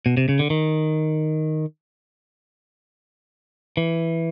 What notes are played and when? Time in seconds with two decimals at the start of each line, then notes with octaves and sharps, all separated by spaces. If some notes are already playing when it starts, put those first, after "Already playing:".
0.06 B2
0.17 C3
0.29 C#3
0.39 D3
0.50 D#3
3.77 E3